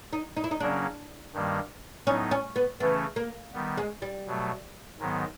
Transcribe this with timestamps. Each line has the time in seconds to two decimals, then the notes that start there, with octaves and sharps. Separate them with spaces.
0.13 D#4
0.37 D#4
0.44 E4
0.51 D#4
0.60 C#3 F#3 A#3 C#4 D4
1.34 G2 D#3 G3 A#3
2.07 A2 F#3 B3 C#4 D#4
2.31 C#4
2.56 B3
2.80 C#3 E3 A3 B3 C#4
3.16 A#3
3.54 D#3 G3 B3
3.77 G#3
4.02 G3
4.26 B2 F#3 A3
4.99 G#2 D#3 F#3 B3